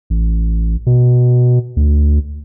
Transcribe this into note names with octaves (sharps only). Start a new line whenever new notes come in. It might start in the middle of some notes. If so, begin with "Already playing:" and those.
A1
B2
D2